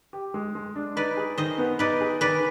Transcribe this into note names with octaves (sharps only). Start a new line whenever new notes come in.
G4
G#3
G#3
D4
D#4 B4 D5
G#4
D#3 C5 D#5
B3
D#4 B4 D5
G#4
D#3 B4 D5